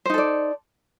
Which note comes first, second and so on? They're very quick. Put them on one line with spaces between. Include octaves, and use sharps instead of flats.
C5 D#4 A4 D5